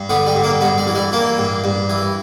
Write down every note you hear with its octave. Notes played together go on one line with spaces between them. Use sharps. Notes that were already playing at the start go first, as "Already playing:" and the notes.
Already playing: G2
D3 B3
G3
G2
A#3
G2 B3
G3
E3
G3
E3 A#3
G2
G2
E3